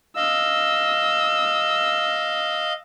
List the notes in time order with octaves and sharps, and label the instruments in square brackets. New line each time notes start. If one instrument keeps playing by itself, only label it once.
[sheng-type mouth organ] D#5 F5 [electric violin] E6